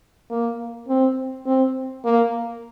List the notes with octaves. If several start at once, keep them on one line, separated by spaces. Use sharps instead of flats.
A#3
C4
C4
A#3